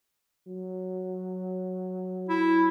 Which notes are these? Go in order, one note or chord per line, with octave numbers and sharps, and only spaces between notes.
F#3
E4